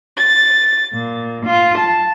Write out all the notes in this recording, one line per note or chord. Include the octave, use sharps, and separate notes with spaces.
A6
A#2
F4
A5